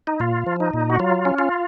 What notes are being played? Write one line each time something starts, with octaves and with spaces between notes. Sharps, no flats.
D#4
A#2 F4
F3
D#4
A#2
F#4
F#3 F4
C#4
F4